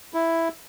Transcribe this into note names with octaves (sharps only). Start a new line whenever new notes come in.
E4